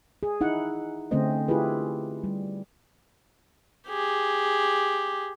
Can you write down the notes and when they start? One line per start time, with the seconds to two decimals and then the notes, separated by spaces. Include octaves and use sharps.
0.23 G#4
0.41 D#4 E4 F#5
1.11 D3 A3 C4 C#4 C5 D#5
1.48 E4 F4 G4 G#4 B4
2.24 G3
3.88 G4 G#4